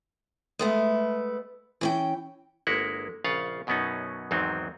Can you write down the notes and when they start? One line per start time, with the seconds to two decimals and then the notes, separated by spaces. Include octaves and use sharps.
0.59 G#3 A3 B3
1.81 E3 C#4 G5
2.67 G1 G#3 A#3 E4 F#5
3.24 A#1 C#3 F4 F5 F#5
3.67 F#2 B2 F#3 B3 C#4 D#4
4.31 E2 G#2 D#3 F#3 C4 D#4